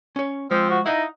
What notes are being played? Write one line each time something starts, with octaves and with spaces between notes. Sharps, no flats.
C#4 C#5
F3 G#3 C4
F#4
D#4 E4 D#5 F5 F#5